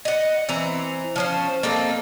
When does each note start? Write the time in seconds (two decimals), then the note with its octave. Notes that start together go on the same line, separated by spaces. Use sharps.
0.05 D#5 F#5
0.49 E3 C4 A#5
1.16 F3 C#4 C5
1.63 A#3 C4 D#4 A4